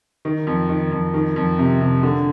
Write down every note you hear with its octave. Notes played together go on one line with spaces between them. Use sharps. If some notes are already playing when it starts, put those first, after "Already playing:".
D#3
F2
D#3
F2
D#3
F2
C3
C3
D3